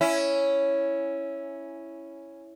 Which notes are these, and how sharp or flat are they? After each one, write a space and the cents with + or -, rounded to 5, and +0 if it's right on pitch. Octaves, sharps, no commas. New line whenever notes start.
C#4 +0 E4 +0